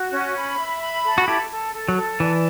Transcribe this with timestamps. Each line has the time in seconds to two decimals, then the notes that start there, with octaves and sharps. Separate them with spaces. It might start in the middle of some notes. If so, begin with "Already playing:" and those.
Already playing: F#4
0.12 C#4
0.35 B5
0.58 E5
0.81 B5
1.04 A4
1.18 F#4
1.28 E4 G4 A4
1.50 A4
1.73 A4
1.89 F#3
1.96 A4
2.20 E3 D5